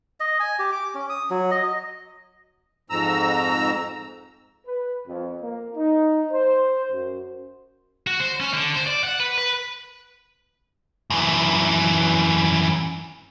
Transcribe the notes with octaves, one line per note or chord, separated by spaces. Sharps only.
D#5
G#5
G4
D6
C#4
D#6
F#3
D#5
D#5
F2 G#2 A#5 E6
B4
F2
A#3
D#4
C5
F#2
F#4
C5
C#4
D3
C5
D5
F#5
B4
B4
F#2 E3